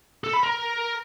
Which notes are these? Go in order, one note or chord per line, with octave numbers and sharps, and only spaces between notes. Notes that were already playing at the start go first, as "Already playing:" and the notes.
A4
B5
A#4